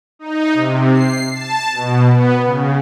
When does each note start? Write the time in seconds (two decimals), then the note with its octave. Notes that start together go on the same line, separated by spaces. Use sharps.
0.19 D#4
0.54 C3
0.93 C7
1.32 A5
1.72 B2
2.08 B3
2.44 C#3